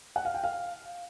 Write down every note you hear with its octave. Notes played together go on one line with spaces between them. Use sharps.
F#5
F5
G5
F5